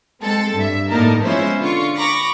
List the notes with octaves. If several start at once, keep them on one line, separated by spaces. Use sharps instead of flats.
G#3 C4 A4
G2 E5
A2 D3 A#3 D#4 A#4 A5
F3 G#3 B3 C#4 E4 C5
D3 F4 C#6
A#5 B5 C#6 D6 A#6